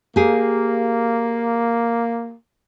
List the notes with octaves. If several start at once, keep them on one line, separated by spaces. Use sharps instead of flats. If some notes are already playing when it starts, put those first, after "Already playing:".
A#3 G4 G#4